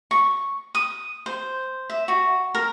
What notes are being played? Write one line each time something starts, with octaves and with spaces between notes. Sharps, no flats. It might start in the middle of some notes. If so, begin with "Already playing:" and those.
C#6
D#6
C5
E5
F#4
A#4